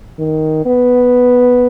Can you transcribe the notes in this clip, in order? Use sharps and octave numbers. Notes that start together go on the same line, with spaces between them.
D#3
B3